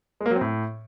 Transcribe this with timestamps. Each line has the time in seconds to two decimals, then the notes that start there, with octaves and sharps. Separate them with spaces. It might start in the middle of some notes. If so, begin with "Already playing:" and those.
0.21 G#3
0.26 A#3
0.31 F#3
0.36 C4
0.41 A2